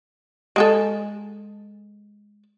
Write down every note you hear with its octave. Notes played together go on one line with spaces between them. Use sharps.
G#3 G#4 A4